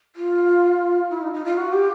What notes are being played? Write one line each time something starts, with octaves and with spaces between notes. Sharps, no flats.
F4
E4
D#4
D#4
F4
F#4
G4